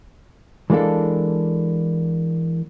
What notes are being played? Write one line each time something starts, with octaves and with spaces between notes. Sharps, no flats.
E3 G#3 A#3 D4 A4